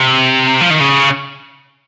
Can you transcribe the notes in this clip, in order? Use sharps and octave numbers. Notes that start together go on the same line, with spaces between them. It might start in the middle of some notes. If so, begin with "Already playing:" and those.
Already playing: C3
F3
D#3
C#3